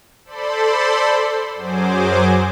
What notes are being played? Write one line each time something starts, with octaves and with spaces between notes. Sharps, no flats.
A4 C5 D5 B5 C6
F#2 F#3 G#4 C5 D6